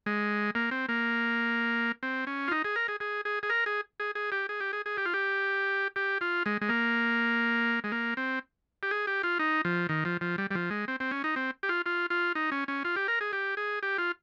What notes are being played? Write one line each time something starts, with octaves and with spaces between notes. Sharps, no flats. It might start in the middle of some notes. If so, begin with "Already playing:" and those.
G#3
A#3
C4
A#3
C4
C#4
F4
D#4
G#4
A#4
G#4
G#4
G#4
G#4
A#4
G#4
G#4
G#4
G4
G#4
G4
G#4
G#4
G4
F4
G4
G4
F4
G#3
G#3
A#3
G#3
A#3
C4
G4
G#4
G4
F4
D#4
F3
D#3
F3
F3
G3
G3
F3
G#3
C4
C4
C#4
D#4
C4
G4
F4
F4
F4
D#4
C#4
C#4
F4
G4
A#4
G#4
G4
G#4
G4
F4